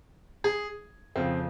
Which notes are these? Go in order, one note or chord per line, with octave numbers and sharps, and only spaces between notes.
G#4
F2 C#3 F3 C4